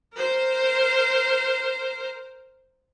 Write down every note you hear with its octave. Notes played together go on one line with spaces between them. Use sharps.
A#4 C5